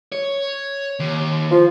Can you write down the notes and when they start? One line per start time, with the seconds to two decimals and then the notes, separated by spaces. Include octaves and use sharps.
0.12 C#5
1.00 D#2
1.51 F3